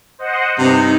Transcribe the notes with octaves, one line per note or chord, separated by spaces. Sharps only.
C5 D#5 F#5
G2 C3 D#4